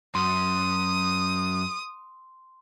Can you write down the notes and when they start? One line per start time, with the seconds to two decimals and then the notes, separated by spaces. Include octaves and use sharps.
0.15 F#2 C6 D#6